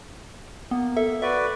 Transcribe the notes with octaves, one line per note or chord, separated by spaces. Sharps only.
A#3 B3
A4 E5
F#4 B4 D5 E5